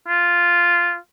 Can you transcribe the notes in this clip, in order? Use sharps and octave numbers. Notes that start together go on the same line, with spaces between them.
F4